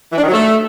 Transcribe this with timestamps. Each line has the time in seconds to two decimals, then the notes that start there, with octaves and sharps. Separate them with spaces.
0.12 E3
0.17 D4
0.22 D#3
0.28 F#3
0.33 A3